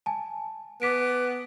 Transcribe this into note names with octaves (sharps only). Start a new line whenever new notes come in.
G#5 A5
B3 D6 B6 D7